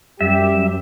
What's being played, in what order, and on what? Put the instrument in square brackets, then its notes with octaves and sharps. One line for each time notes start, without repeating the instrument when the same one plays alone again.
[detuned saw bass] F#2 [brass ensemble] G3 G4 [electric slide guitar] E5